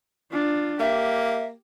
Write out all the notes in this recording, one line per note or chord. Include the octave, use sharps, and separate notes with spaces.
D4 F4
A#3 G4 E5